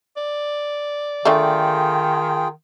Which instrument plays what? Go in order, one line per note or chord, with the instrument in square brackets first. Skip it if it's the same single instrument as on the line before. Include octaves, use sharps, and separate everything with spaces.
[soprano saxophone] D5
[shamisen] D3 A3 [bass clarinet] D#3 [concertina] F4 G#4 G5